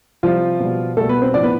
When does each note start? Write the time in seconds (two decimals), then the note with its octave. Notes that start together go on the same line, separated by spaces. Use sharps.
0.23 C3 F3 G3 F4
0.60 B2 G3
0.97 B2 G3 A3 A4
1.09 B3 B4
1.22 C4 C5
1.34 A2 F3 D4 D5
1.43 B3 B4